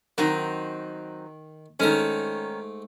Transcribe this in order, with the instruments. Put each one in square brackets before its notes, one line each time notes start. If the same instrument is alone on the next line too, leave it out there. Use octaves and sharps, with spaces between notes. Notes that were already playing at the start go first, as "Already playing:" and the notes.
[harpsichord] D#3 [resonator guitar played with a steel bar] F#3 C4 D#4
[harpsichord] G#2 A3 A#5 [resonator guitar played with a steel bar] D#3 C#4